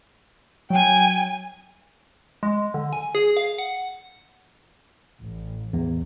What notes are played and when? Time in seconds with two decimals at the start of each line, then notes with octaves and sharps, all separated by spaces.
0.70 F#3 G5 G#5
2.43 G#3
2.74 D3
2.93 G#5
3.15 G#4
3.37 F5
3.58 F#5
5.21 A1
5.73 E2